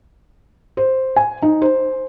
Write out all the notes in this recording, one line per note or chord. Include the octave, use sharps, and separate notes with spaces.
C5
G#5
D#4
C5